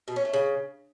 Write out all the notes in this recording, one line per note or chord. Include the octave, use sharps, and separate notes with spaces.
B2
C#4
A3
C#3